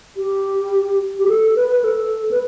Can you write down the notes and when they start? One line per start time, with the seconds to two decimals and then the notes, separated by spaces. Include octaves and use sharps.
0.17 G4
1.19 G4
1.28 A4
1.56 B4
1.72 B4
1.84 A4
2.31 B4